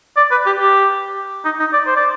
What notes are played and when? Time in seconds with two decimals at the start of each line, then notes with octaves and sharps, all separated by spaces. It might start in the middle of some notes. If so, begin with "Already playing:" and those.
0.17 D5
0.31 B4
0.46 G4
0.59 G4
1.45 D#4
1.59 D#4
1.73 D5
1.86 C5
1.96 D5